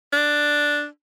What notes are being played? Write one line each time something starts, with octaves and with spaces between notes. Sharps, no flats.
D4